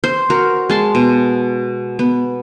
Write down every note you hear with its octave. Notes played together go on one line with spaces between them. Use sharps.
C5
F#4 A#4
G#3 A5 C6
B2
B3